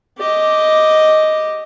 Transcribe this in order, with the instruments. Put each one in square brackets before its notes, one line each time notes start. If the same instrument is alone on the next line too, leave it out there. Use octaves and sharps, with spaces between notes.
[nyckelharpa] G4 D#5